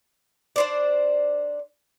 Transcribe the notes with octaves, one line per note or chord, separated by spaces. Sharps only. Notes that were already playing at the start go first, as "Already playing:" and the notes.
D4 C5 D5